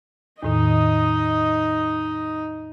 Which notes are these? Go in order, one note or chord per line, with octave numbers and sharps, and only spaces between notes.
E2 A2 D#3 D#4 D#5